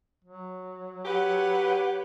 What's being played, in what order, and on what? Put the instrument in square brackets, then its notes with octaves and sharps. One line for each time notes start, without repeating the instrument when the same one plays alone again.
[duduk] F#3
[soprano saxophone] G4 [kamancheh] B4 C#5 [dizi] F#5